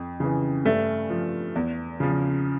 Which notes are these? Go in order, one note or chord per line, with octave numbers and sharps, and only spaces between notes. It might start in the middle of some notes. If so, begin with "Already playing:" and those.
Already playing: F2
C#3 E3
G2 A3
F3
E2
C#3 F3